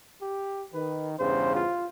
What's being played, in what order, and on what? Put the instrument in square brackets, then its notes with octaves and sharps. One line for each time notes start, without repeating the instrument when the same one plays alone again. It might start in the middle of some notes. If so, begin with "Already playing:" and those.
[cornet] G4
[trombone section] D#3 [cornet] B4
[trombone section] E2 G2 C#3 [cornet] C5
[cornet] F4